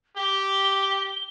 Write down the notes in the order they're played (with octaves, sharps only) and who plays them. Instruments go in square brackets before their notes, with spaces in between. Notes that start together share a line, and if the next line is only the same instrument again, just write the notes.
[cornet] G4 [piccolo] G7